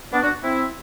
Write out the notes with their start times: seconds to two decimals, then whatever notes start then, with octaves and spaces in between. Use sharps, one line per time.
0.13 B3 D4
0.23 D4 F#4
0.44 C4 E4